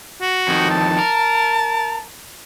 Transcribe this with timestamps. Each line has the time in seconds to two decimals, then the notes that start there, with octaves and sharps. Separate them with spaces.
0.21 F#4
0.48 F2 D#3
0.70 A5
0.98 A#4